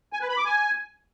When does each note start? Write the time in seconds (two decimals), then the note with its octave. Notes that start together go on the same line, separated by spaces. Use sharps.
0.13 G#5
0.21 B4
0.29 B5
0.37 D6
0.45 G#5